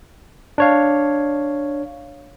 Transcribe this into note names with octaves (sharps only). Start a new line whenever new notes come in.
D4 C#5 F5